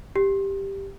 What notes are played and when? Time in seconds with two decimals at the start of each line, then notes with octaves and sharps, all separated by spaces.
0.16 G4